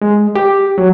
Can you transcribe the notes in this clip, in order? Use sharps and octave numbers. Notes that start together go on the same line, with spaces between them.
G#3
G4
F#3